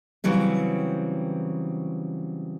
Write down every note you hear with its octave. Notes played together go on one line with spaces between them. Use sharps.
C#3 E3 F#3 G3 C4